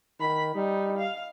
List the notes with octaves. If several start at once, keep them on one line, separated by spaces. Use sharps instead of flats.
D#3 B5
G3 D#4
F5